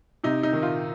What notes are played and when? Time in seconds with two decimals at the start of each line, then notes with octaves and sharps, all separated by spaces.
0.24 C3 D#4
0.43 D#4
0.53 D#3
0.62 F4